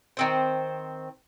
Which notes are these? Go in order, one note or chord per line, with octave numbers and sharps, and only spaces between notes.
D#3 C4 C5